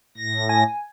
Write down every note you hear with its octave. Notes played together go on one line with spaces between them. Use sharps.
A2 A#6
G#5